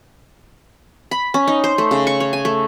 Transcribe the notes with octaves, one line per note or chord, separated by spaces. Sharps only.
B5
C#4
D#4
C5
A3
C#3
C#6
C#5
G#5
A3